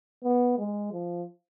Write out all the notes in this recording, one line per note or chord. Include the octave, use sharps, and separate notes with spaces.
B3
G#3
F3